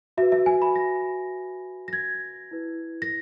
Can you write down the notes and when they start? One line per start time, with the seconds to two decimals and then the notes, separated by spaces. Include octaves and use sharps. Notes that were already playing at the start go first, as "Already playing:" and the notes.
0.17 F#4 B4 E5
0.32 E5
0.46 G#5
0.62 B5
0.76 A#6
1.88 A#6
1.93 G#6
2.51 E4 B4
3.02 A#6